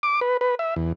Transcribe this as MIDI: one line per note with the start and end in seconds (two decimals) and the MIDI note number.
0.03 0.20 86
0.21 0.37 71
0.41 0.55 71
0.59 0.74 76
0.76 0.92 40